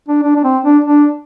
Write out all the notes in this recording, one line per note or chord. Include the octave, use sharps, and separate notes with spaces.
D4
D4
D4
C4
D4
D4